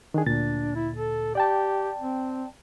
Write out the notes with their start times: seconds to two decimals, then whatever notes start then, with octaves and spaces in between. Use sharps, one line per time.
0.14 D#3 D4 G#4
0.27 D2 A#2 D4 A6
0.76 E4
0.95 A4
1.35 G4 D5 G5 A5
1.99 C4